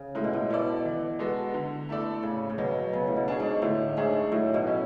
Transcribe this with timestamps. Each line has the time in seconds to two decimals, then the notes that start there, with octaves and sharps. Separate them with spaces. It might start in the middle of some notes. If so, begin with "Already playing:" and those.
Already playing: C#3
0.15 A2 G#3
0.24 B2
0.33 A2
0.49 B2 B3 E4 A4 D5
0.85 E3
1.19 G#3 B3 F#4 A4
1.54 D3
1.89 A3 E4 A4 D5
2.23 A2 C#3
2.50 C#3
2.58 B2 F#3 B3
2.93 C#3 B3
3.07 A2
3.16 B2
3.28 D4 G#4 C#5
3.40 G#2
3.62 A2 D3
3.97 G#2 A3 D4 G#4 C#5
4.32 A2 F#3
4.54 B2
4.67 C#4 E4